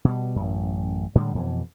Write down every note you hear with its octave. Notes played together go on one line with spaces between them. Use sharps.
B2 G3
A1 F#2
A2 D3 G3 G#3
F2 B2 E3